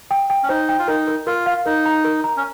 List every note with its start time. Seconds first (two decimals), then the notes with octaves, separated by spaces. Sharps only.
0.11 G5
0.30 G5
0.43 C#4
0.49 D#4 C5
0.69 G5
0.79 F4
0.88 D#4 A#4
1.08 A#4
1.27 F4 A#4
1.46 F5
1.65 D#4 A#4
1.86 A#5
2.05 A#4
2.24 A#5
2.37 C#4